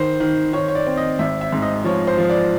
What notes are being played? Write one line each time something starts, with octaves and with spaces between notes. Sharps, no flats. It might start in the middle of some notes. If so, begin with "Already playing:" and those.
Already playing: D#3 C5
D#3
D#3 C#5
C#5
D5
C4
D#5
G#1 E5
E5
G#2
D#5
F3 C#5
C5
F3
D5